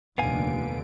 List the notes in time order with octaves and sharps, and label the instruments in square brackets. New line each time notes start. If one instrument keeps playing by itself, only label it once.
[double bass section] F1 D#2 [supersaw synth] A#2 D3 D7 [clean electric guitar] B3 F5 G#5